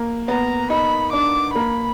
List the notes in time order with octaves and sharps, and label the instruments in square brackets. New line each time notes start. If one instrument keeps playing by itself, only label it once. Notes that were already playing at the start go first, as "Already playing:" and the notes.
Already playing: [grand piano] A#3
[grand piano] B3 [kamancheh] A#5
[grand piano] D#4 [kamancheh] B5
[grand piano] D4 [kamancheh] D6
[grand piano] A#3 [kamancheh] B5